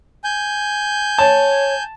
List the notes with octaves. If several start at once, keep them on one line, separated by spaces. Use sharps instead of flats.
G#5 G6
C#5 A5